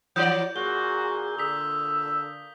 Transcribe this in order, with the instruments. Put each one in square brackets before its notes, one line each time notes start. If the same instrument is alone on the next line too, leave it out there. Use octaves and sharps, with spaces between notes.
[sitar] E3 F#3 D5 [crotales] G6
[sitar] A#2 [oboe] F#4 [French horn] G#4 [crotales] G7
[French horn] D3 [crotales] D#6 B6 [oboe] E6